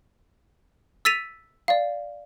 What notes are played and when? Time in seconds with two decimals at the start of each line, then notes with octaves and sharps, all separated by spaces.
1.05 E6 A6 B6 D#7 F7
1.68 D5 F5